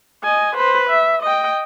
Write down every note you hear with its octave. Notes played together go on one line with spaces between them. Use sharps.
D#5 G#5
B4 C5
E5
D#5 G5